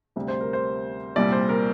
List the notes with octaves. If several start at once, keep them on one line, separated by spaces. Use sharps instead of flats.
D2 C3 G3
C5
A#4
C5
C2 A#2 G3 D5
C5
A#4